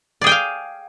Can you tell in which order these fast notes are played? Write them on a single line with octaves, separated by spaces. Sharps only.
D5 G#4 G5 G#5 F5